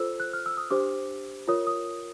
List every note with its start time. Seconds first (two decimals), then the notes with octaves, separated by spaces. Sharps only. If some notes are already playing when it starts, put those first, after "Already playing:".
Already playing: F4 A4 C5 E6
0.20 F#6
0.33 F6
0.46 E6
0.57 D#6
0.70 D4 G4 C5 D6
1.48 F4 A#4 C#5 D#6
1.67 D#6